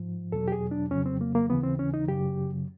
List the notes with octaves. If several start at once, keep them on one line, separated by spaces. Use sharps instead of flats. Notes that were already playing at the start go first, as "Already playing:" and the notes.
Already playing: G#2 F3
E2 B2 F#3 A4
G4
G#4
D4
F2 C#3 F#3 C#4
C4
A#3
A#3
D#2 C#3 E3 B3
C4
C#4
D#4
F#2 C#3 F#3 G4